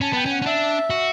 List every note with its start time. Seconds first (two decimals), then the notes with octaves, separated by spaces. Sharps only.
0.01 C#4 A5
0.13 B3 G5
0.26 C#4
0.31 F#5
0.42 C#4
0.46 D4 E5
0.90 F#4